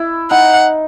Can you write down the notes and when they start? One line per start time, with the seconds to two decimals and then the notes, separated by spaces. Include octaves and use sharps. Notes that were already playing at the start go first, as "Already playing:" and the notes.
Already playing: E4
0.31 D#4 F#5